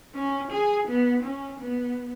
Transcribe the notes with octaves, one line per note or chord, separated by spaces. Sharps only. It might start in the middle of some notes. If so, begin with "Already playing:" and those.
C#4
G#4
B3
C#4
B3